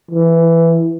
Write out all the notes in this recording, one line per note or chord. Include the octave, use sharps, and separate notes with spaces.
E3